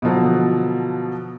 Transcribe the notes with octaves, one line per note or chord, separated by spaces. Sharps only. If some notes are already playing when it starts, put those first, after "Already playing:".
B2 D3 F3 F#3